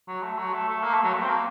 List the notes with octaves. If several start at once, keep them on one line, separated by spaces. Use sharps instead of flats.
F#3
A3
F#3
A3
A3
A#3
A3
F#3
A3
C4
A#3